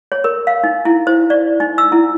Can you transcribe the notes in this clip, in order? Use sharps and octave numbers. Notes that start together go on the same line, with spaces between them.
C#5
A#4
F5
D#4
E4
C5
D5
D#4
E6
E4